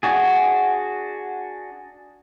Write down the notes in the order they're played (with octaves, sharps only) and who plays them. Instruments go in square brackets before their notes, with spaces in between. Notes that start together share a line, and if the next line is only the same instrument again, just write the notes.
[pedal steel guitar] D4 F#4 G#4